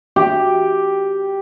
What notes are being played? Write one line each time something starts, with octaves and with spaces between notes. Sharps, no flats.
G4